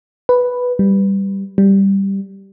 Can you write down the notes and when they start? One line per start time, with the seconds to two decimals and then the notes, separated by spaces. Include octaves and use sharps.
0.29 B4
0.79 G3
1.58 G3